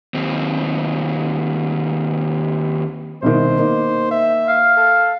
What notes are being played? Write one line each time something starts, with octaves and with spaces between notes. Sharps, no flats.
D#2 C4
C2 B2 D#3 C5
A#3 D#4
E5
F5
A4